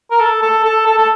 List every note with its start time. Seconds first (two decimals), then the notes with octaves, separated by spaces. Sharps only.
0.11 A#4
0.20 A4
0.42 A4
0.64 A4
0.86 A4
0.98 A4